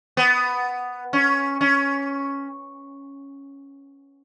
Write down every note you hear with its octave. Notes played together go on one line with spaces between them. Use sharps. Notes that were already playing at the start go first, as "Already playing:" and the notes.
B3
C#4
C#4